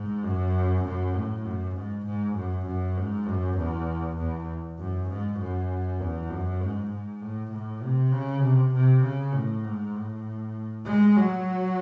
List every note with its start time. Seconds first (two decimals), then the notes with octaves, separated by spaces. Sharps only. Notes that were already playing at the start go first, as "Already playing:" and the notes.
Already playing: G#2
0.23 F#2
0.84 F#2
1.15 A2
1.45 F#2
1.75 G#2
2.06 G#2
2.35 F#2
2.66 F#2
2.97 G#2
3.27 F#2
3.58 E2
4.18 E2
4.79 F#2
5.10 G#2
5.39 F#2
6.01 E2
6.30 F#2
6.61 G#2
6.91 G#2
7.22 A2
7.52 A2
7.82 C3
8.13 C#3
8.43 C3
8.74 C3
9.04 C#3
9.34 A2
9.64 G#2
9.95 A2
10.86 G#3
11.16 F#3